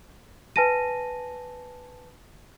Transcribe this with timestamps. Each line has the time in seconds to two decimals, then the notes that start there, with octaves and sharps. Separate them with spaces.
0.56 B4 G#5 A5 A#6 D#7